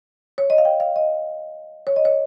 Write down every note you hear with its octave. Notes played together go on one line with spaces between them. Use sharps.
C#5
D#5
F5
G5
F5
D#5
C#5
D#5
C#5